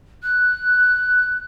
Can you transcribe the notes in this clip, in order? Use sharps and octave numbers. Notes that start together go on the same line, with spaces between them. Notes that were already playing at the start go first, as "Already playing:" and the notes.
F#6